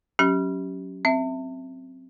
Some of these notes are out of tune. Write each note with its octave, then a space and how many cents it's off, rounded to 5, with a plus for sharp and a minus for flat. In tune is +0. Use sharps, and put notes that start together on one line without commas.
F#3 +0 C#4 +0 G4 -25
C4 +0 E5 +0